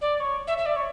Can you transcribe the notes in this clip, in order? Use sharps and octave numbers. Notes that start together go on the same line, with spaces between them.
D5
C#5
E5
E5
D5
C#5